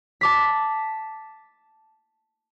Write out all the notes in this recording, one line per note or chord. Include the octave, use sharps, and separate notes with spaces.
A5 D6 B6